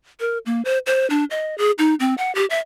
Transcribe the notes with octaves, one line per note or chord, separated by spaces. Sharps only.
A#4
A#3
C5
C5
D4
D#5
G#4
D#4
C4
F#5
G4
E5